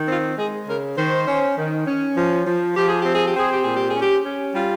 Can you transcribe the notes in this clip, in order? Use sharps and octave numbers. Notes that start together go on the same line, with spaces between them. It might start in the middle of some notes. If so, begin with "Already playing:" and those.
Already playing: D#3
C4 F4
G#3 G#4
C#3 A#4
D#3 C5
C#4
D#3
C#4
F3
F3
F3 G4
G#4
C4 G4
G#4
G4
C4 G#4
G4
A#2 G#4
G4
G#4
C#4
G4
C#4
G3 F4